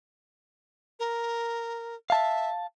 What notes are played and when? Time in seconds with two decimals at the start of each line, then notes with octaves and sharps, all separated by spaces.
1.00 A#4
2.10 E5 F5 A5